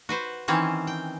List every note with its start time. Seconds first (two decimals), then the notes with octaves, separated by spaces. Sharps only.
0.09 F#4 B4 C5
0.48 D#3 E3 C4 C#4
0.87 G5